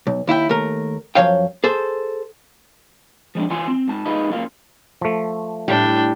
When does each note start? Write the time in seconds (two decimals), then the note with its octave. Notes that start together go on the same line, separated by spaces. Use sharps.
0.07 B1
0.27 D#2 E4 E5 G5
0.49 D#2 A3 A#4
1.15 F#2 B2 F3 C#5 F5 G5
1.64 G#4 A4 C5
3.35 F3 G#3 C#4 D4
3.50 E3 F4 G#5 C6
3.68 C4
3.88 G#2 A5
4.05 G#3 D#4 F4 B4
4.30 F#2 A#3 F4
5.01 F3 A3
5.68 A2 G3 D4 G5